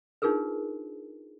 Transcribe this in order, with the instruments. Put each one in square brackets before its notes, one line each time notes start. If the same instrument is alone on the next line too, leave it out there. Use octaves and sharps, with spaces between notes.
[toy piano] D4 D#4 F4 G#4 A#4 B4